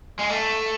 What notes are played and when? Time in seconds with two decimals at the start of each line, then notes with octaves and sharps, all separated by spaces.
0.19 G#3
0.29 A3